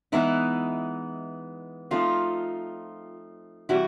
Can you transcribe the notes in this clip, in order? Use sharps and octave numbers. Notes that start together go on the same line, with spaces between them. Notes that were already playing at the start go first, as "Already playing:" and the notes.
E3 G#3 B3 D#4 E4
F3 A3 C4 D#4 F4
C3 E3 G3 E4 F#4